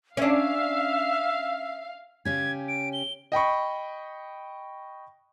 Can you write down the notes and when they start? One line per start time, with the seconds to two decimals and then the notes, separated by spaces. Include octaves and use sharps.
0.17 C#4 D4 E5 F5
2.25 C#3 C#4 G4 G#6
2.68 D7
2.93 G7
3.32 D#5 G5 B5 C#6